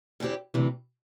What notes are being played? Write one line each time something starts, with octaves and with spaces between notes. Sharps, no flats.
E2 D3 C4 E4 G4
D2 C3 E3